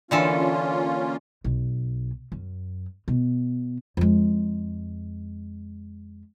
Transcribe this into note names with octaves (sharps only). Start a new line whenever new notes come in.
D3 E3 A#3 C#4 F4 A4
B1
F#2
B2
F2 G#3